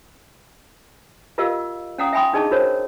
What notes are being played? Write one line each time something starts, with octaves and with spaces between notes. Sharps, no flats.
F4 G4 A#4 D#5 F5 E6
C#4 F5 F#5 A#5 D#6
E5 G5 G#5 B5 C6 D#6
D4 D#4 G#4 D#5 A5 C#6
F#4 A#4 C5 C#5